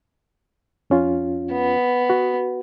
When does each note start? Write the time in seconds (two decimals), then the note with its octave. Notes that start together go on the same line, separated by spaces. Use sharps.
0.90 F2 C#4 F4
1.52 B3
2.10 F#4